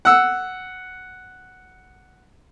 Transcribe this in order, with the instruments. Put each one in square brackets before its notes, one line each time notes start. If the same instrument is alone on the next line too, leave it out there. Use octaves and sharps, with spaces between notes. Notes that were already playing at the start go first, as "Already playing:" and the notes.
[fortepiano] F#5 E6